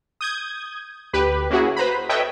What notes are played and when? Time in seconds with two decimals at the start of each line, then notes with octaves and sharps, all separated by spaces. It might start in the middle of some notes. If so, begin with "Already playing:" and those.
0.21 D#6 G6 G#6
1.13 D2 G4 B4
1.50 A#3 C#4 E4 F#4 G#4
1.76 B4 C5 A#5 B5
2.09 A4 B4 C#5 D#5 E5 G5